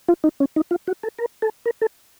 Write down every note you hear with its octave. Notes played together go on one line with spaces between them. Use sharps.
F4
D#4
C#4
D#4
F4
F#4
A4
A#4
A4
A#4
A4